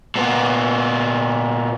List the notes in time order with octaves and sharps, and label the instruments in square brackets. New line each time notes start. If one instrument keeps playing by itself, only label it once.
[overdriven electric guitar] A#2 B3